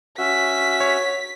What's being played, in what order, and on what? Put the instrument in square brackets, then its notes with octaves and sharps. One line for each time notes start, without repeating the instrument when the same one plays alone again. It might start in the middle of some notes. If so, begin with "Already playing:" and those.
[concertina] C#4 E5 [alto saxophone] F#4 [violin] B6
[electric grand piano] C#5